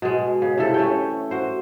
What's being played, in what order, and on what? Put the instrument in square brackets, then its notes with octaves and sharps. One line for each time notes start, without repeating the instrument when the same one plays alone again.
[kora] B2 G#3
C#3
C3 E3 A4
A3 C#4 C#5 G5
F#4 C5